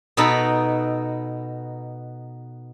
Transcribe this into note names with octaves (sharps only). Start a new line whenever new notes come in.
B2 B3 D#4 A4 B5